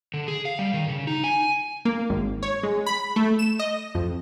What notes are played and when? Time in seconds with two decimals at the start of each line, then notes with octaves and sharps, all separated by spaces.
0.14 D3
0.28 G#4
0.45 F5
0.59 G3
0.74 D#3
0.88 C#3
1.07 D#4
1.24 G#5
1.85 A#3
2.10 G#1
2.43 C#5
2.63 G#3
2.86 B5
3.16 A3
3.39 E7
3.59 D#5
3.95 F2